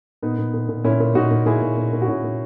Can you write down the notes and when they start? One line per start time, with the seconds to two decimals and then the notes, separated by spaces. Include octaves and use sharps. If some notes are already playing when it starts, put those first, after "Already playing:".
0.23 A#2 B3 D#4
0.38 A#2
0.54 A#2
0.69 A#2
0.84 A#2 C#4 E4
1.00 A#2
1.15 A#2 D#4 F#4
1.31 A#2
1.46 A#2 E4 G#4
1.62 A#2
1.77 A#2
1.93 A#2
2.02 F#4
2.08 A#2 C#4 E4
2.24 A#2